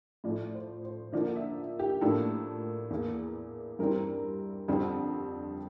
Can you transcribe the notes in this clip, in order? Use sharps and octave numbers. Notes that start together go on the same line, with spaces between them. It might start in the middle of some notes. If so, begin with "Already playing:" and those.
A2 F3 A3 D5
C5
C5
D3 F3 A#3 D5
E5
G4
A2 F3 A#3 D4 A4
E2 E3 A#3
G2 E3 G3 C4 A#4
F2 D3 G3 C4